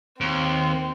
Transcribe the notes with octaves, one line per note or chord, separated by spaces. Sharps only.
D#2 C4